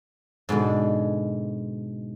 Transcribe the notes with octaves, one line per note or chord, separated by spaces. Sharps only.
G#2 B2 D3 G#3